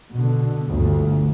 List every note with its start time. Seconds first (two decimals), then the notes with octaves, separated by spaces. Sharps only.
0.15 B2 D3
0.68 G1 D2